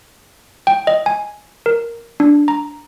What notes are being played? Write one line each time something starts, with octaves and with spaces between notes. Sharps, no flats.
G5
D#5
G#5
A#4
D4
A#5